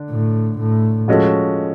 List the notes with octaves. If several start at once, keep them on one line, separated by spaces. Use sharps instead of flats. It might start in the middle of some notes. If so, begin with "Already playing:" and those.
Already playing: D3 D4
A2
A2
F3 G#3 C#4 F#4 A4